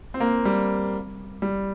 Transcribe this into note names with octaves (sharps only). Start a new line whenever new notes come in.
C4
A#3
G3
G3